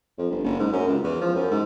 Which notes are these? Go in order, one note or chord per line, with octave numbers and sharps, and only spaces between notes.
F2
G1
F#1
G#2
F#2
C#2
E2
F3
F#2
G#2